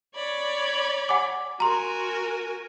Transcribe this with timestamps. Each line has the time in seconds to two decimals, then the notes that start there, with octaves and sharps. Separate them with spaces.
0.16 C#5 D5 B5
1.09 F#5 G#5 D6
1.60 F#4 A#4 G#5 A#5 C6